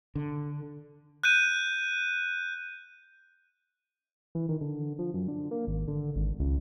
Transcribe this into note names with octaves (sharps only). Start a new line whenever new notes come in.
D3
F#6 G6 D#7
E3
D#3
D3
F3
F#2
D3
A#3
G#1
D3
G#1
C#2